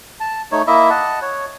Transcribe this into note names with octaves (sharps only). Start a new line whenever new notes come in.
A5
A3 D#4 C#5
A#3 E4 D#5 E5
D#5 F#5 A5
C#5